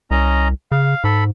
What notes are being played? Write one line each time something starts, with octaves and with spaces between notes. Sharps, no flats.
C2 C#4 D#5 A#5
C#3 F5
G#2 A4 B5